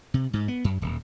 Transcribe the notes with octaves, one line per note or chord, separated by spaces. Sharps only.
C3
G#2
B3
F#2
D#1